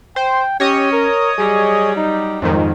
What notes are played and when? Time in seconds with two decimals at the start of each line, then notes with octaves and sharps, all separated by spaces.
0.16 C5 G5
0.60 C#4 G4 C#5 D#5 D#6
0.92 A#4
1.38 F#3 G3 G#4
1.96 D#4
2.42 F2 G#2 D#3 C5